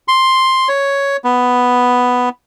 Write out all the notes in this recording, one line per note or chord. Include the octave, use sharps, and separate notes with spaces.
C6
C#5
B3